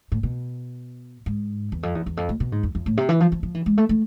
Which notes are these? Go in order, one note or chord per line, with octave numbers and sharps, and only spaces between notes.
A2
B2
G#2
E2
F2
E2
E2
F2
A2
B2
G#2
F2
F2
A2
C3
E3
F3
F3
F3
E3
G#3
A3
A3